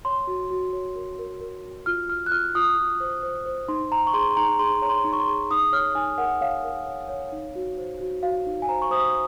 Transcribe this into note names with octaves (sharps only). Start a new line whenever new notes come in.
C#5 C6
F#4
F#4
C#5
A#4
A#4
A#4
F#4
F4 F6
F4 F6
F#6
F4 F6
F4 D#6
F4
C5
C5
C5
D#4 C6
D#4 A#5
C#6
G#4 C6
C6
D#4 A#5
G#4 C6
C#5 A#5
C6
D#4
C#6
C6
G#4
D#4 D#6
C#5 F6
D#4 G#5
A#4 F#5
C#5 F5
A#4
C#5
C#5
D#4
F#4
C5
F#4
F#4 F5
D#4
G#5
C5 A#5
C#6
C5 D#6